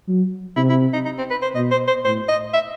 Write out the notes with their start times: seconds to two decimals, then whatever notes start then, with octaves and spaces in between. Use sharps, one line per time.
0.08 F#3
0.56 C3 E4
0.69 E4
0.93 D#4
1.05 D#4
1.18 C4
1.31 B4
1.42 C5
1.55 B2 D#5
1.71 C5
1.88 C5
2.04 A2 C5
2.28 D#5
2.54 E5